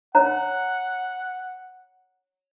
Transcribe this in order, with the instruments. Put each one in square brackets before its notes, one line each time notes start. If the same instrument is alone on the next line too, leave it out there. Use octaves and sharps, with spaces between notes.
[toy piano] C#5 A#5 [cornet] F#5